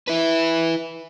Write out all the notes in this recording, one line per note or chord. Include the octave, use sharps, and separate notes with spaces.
E4 B4